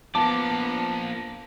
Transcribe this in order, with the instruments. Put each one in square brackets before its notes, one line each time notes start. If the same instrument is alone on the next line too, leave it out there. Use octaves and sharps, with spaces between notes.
[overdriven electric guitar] F3 A#3 [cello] B3 [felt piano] A5 [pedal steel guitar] D6